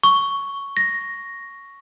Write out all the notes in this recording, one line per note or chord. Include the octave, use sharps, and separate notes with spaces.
C#6
A#6